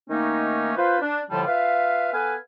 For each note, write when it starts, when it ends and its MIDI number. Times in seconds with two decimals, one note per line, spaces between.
0.09 0.71 51
0.09 0.71 57
0.09 0.71 58
0.09 0.71 61
0.09 0.71 63
0.76 1.01 65
0.76 1.01 71
0.76 1.01 72
1.01 1.19 62
1.31 1.45 45
1.31 1.45 50
1.31 1.45 53
1.31 1.45 55
1.31 1.45 65
1.31 1.45 81
1.46 2.10 65
1.46 2.10 71
1.46 2.10 76
1.46 2.10 77
2.12 2.35 59
2.12 2.35 69
2.12 2.35 71
2.12 2.35 77
2.12 2.35 80